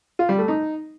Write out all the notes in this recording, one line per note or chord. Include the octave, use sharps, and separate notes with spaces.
F4
G3
A3
D#4